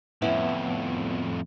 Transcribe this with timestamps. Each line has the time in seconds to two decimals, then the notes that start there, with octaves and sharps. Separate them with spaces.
0.22 F2 A2 B3 C#4 E4